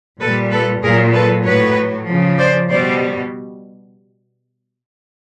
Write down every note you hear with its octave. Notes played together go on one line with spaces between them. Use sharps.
A#2 G3 A4 B4
A4 B4
A#2 F#3 G#4 A#4
A4 B4
A2 F#3 B4 C#5
C#3 F3
C5 D5
B2 G3 C5 D5